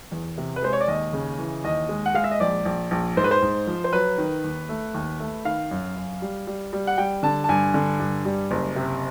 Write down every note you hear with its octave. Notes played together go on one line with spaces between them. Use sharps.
E2
C3
B4
G#3 C5
C#5
D5
D#2 D#5
C#3
E3
D#2 D#5
G#3
F#5
G#3 F5
E5
D#5
A#1 D5
A#1
A#1
G#2 C5
B4
C5
G#2
F3
C5
F#3 B4
D#3
D#2
A3
D#2
A3
D#3 F5
F#2
F#2
G3
G3
G3
F#5
G3 G5
D3 A5
A5
G2 G#5
D3
G2
G3
F#1
C3